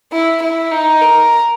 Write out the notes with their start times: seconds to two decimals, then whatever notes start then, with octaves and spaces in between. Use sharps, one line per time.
0.12 E4
0.42 E4
0.71 D#4
1.01 A#4